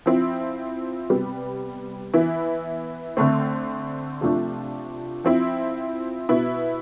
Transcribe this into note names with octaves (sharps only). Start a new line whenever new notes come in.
F3 C4 E4
C3 G3 B3
E3 B3 E4
D3 A3 C4
C3 F3 A3 D4
F3 C4 E4
B2 B3 E4